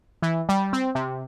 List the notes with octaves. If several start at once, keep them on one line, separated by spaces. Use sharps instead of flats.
E3
G3
C4
C3